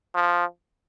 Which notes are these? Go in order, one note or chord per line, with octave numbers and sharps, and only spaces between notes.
F3